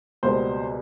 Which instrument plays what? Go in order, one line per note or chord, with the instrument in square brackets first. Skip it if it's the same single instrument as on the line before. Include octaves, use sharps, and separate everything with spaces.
[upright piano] C#2 B2 G3 A#3 C5